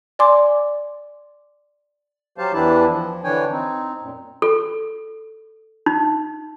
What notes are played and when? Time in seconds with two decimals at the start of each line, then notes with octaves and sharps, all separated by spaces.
0.19 D5 G#5 C6 D6
2.38 F#3 G4 C5 F5 A5
2.53 E2 E3 D4 E4 G4 A5
2.88 F3
3.24 D3 E3 D4 C#5 G5 G#5
3.50 C4 D#4
4.01 F#2 A#2
4.42 A4
5.86 D#4